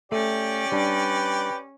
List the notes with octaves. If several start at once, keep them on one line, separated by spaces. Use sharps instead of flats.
A3 C#4 G4 D5
G3 D4 B4